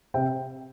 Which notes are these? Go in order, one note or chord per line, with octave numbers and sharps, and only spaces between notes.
C3 G5